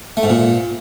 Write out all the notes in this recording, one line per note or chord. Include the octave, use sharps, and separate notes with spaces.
A3
G#2
A#2